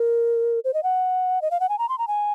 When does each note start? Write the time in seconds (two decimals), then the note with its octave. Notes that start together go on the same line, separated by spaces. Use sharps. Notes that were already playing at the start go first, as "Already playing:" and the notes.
Already playing: A#4
0.64 C5
0.74 D#5
0.83 F#5
1.42 D#5
1.51 F5
1.60 F#5
1.69 G#5
1.79 A#5
1.89 C6
1.98 A#5
2.08 G#5